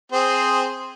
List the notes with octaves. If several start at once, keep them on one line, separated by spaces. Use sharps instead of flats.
C4 G#4 C5